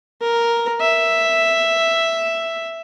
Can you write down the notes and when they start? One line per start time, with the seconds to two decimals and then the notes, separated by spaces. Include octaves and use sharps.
0.22 A#4
0.81 E5